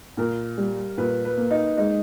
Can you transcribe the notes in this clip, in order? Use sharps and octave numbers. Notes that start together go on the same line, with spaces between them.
A#2 A#4
G3
A#2 B4
B4
A#3
D#4
G#3 D#4